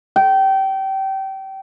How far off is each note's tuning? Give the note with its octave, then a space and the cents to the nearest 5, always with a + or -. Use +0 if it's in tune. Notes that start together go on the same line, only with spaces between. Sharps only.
G5 -25